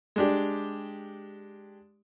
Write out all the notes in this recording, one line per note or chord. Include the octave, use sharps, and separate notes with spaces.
G#3 D4 G4